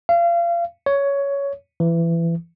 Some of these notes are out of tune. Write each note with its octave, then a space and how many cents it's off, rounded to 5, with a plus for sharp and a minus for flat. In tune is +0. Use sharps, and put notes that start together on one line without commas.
F5 -30
C#5 +10
E3 +25